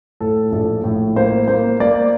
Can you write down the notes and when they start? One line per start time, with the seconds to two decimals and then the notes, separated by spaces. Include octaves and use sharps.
0.20 A2 A4
0.52 A#1 A4
0.84 A2
1.16 A#3 C5
1.48 A#3 C5
1.80 A#3 D5